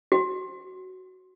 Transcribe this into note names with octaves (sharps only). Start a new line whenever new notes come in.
F#4